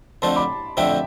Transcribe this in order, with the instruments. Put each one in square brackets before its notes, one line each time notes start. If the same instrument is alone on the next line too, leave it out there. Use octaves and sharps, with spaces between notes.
[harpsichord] F2 D3 A3 C4 [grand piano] A5 C6
[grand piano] B5 D6
[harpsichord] F2 D3 A3 C4 [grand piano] E5 G5